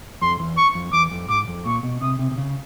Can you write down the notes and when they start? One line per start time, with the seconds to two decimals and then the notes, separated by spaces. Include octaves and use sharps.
0.22 F2 C6
0.40 E2
0.57 C#6
0.75 F2
0.93 E2 D6
1.11 F2
1.29 G#2 D6
1.48 F2
1.66 A#2 C#6
1.83 B2
2.01 C3 D#6
2.19 C3
2.31 C3
2.38 C#3